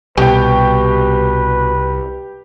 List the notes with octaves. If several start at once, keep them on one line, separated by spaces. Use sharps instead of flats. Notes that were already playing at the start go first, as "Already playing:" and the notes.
C2 B2 G4 B4 G5